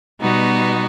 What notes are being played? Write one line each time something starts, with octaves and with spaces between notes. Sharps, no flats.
B2 G3 B3 D#4 F#4